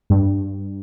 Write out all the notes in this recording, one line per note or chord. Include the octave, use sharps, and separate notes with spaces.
G2